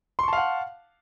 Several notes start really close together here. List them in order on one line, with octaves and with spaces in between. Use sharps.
C6 C#6 A5 F5 F#5